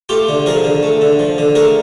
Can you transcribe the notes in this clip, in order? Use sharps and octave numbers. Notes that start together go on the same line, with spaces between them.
A3 F4 G4
D3
F3 G#4 A#4
D3
A3
D3
F3
D3
A3 G#4 A#4